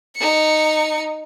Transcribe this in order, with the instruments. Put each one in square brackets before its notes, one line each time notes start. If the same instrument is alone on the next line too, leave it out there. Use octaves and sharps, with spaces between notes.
[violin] D#4 C#7